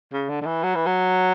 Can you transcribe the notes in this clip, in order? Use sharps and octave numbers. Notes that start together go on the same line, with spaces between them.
C#3
D3
D3
E3
F#3
E3
F#3